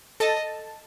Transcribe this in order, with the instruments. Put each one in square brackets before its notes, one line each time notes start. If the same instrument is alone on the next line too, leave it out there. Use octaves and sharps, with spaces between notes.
[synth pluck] A4 A5 [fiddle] D#5